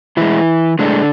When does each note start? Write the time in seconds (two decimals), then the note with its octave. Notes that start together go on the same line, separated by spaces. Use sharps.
0.17 A2 E3 G#3 E4
0.79 A2 D3 G#3 D4